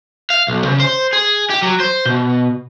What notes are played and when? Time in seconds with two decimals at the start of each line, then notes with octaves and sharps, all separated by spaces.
0.30 F5
0.48 B1
0.65 C#3
0.80 C5
1.13 G#4
1.50 G4
1.62 F#3
1.80 C5
2.05 B2